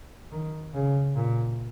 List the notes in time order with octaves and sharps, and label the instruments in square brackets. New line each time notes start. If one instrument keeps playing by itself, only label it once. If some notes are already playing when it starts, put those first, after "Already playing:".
[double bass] D#3
C#3
A#2